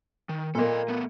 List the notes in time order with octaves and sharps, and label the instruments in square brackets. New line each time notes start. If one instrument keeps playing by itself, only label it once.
[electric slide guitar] D#3
[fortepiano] A#2 A#3 [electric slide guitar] A4 D#5
[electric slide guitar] A3 B3